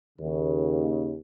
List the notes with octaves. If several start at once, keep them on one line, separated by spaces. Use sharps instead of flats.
D#2 C#3